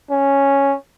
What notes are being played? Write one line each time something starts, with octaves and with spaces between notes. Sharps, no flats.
C#4